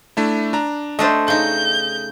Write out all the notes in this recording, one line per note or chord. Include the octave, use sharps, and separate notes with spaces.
A3 D4 E4
D4 A#5
A3 D4 C5 D#5
C#3 D#4 G6